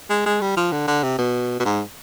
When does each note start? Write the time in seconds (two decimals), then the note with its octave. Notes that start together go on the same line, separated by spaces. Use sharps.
0.10 G#3
0.26 G#3
0.41 G3
0.57 F3
0.72 D3
0.87 D3
1.03 C3
1.19 B2
1.60 B2
1.65 G#2